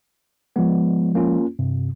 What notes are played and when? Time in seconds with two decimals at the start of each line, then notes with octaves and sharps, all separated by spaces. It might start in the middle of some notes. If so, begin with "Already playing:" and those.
0.56 F3 G#3 B3
1.15 A#3 C#4 F4
1.59 G2 C3